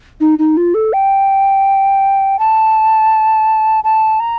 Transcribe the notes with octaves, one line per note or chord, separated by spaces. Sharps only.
D#4
D#4
F4
A4
G5
A5
A5
A#5